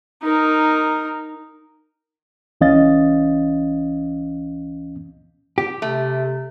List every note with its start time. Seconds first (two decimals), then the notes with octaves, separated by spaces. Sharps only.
0.24 D#4 A#4
2.61 C#2 E3 C#4 D#5 F5 A6
5.58 G4
5.82 C3 A3